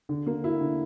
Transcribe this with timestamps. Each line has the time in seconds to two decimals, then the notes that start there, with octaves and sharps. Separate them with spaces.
0.09 D3
0.26 A#3
0.44 E4
0.61 D3